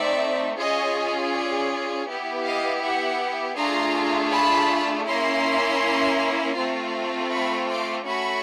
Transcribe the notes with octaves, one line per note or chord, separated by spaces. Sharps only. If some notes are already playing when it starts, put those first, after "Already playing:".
Already playing: A3 C4 D#4 D5 E5
C#4 F4 G#4 C#5 D#5
D5
B3 E4 G4
D#5 F5
E5 F#5
A3 D4 F4 G#4 A#5 C6
A5 B5
A#3 C#4 E4 A#5 C6
A3 C4 F4
B5 C#6
C6 D6
A3 C#4 F#4 A4 B5 C#6